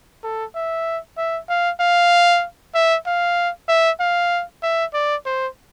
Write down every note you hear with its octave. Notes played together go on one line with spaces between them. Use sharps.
A4
E5
E5
F5
F5
E5
F5
E5
F5
E5
D5
C5